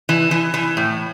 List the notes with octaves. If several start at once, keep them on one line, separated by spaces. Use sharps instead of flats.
E3
E3
E3
A2